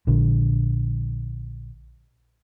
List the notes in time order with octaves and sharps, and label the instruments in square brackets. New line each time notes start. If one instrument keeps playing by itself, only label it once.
[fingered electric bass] A#1 D3